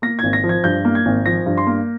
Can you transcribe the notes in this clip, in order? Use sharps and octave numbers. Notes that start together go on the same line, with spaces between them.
A#3 A#6
G#6
G#1
A#6
F3
G#6
G2 G6
A#3
G#6
G#1
F3 A#6
G2
C6
A#3